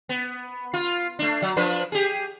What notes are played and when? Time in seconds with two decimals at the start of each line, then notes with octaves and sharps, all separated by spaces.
0.09 B3
0.74 F4
1.19 A3 D4
1.42 F#3
1.57 F3 D4 B4
1.92 G4 G#4